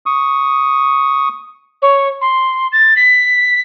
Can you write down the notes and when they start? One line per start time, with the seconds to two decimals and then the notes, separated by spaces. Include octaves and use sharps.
0.06 C#6 D#6
1.82 C#5
2.21 C6
2.72 A6
2.96 B6